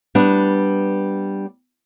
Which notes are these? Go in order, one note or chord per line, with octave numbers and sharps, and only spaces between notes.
G3 B3 D4